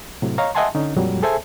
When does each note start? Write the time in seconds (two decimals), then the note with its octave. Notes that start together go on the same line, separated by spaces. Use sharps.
0.22 A2 C3 F#3
0.38 C#5 D#5 F5 A#5
0.55 D#5 E5 F#5 G#5 A5 C6
0.75 D3 C#4 D#4
0.96 F2 A#2 F#3 G3
1.23 G#4 A4 C5 E5 G#5 A5